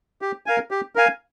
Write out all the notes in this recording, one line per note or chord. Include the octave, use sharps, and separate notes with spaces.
G4
A#4 F5 G#5
G4
A#4 F5 G#5